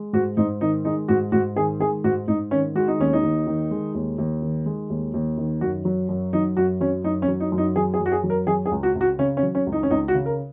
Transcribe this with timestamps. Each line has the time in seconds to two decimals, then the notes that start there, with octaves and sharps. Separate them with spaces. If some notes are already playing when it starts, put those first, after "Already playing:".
Already playing: G#3
0.13 G#2 F#4
0.37 G#2 D#4
0.61 D#3 D#4
0.85 G#3 D#4
1.08 G#2 F#4
1.32 G#2 F#4
1.56 D#3 G#4
1.80 G#3 G#4
2.04 G#2 F#4
2.28 G#2 D#4
2.51 D#3 C#4
2.75 G#3 F#4
2.88 D#4
2.99 D#2 C#4
3.13 D#4
3.23 D#2
3.47 D#3
3.71 G#3
3.94 D#2
4.18 D#2
4.42 D#3
4.66 G#3
4.90 D#2
5.14 D#2
5.37 D#3
5.61 F#2 F#4
5.85 F#3
6.09 F#2
6.33 F#3 D#4
6.57 F#2 F#4
6.80 F#3 C#4
7.04 F#2 D#4
7.22 C#4
7.28 F#3
7.40 D#4
7.52 F#2
7.58 D#4
7.76 F#3 G#4
7.94 G#4
8.00 F#2
8.06 F#4
8.12 G#4
8.24 F#3
8.30 A#4
8.47 F#3 G#4
8.66 G#4
8.71 C#2
8.83 F#4
8.95 C#2
9.01 F#4
9.19 C#3 C#4
9.37 C#4
9.43 F#3
9.55 C#4
9.67 C#2
9.72 D#4
9.83 C#4
9.90 C#2 D#4
10.08 F#4
10.14 C#3
10.26 A#4